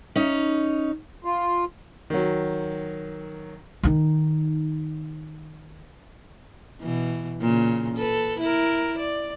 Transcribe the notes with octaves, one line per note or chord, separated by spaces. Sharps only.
C#4 D#4
F4
D#3 F#3
D#3 D#4
B2 E3
A#2 C#3
A4 B4
E4 A#4
D5